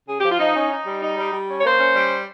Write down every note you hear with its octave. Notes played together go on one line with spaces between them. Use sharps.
C#3 G#4
G4
F3
F4
F3 D#4
C#4
D#4
G3
D#4
G3
G3
C#4
C#5
A#3 C5
C#4
G3